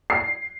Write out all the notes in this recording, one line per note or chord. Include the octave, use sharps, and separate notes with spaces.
C7